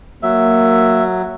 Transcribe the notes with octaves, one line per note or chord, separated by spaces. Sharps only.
F#3 A#3 E5